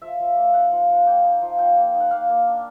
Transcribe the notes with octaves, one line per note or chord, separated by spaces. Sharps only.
F3 E5
F3
A#3
D#4 F#5
F3
F3
A#3 G5
D#4
F3
F3 G5
A#3
D#4
F#5
A#3 F5
A#3
D4